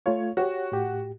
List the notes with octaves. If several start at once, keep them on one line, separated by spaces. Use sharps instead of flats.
A3 F4 C#5 F5
F#4 G4 C#5
A2 G4